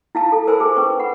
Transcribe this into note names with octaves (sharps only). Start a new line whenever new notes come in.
E4 F5 A5
A4
A#4 C5 G#5 B5 E6
G#4
C#4 B4 C#6
B4 F#5 B5